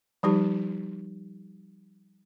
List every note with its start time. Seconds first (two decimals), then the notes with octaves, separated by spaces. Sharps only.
0.23 F3 G3 D#4 G4